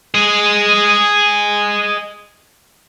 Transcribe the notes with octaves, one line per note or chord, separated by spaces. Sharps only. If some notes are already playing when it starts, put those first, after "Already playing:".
G#4 D#5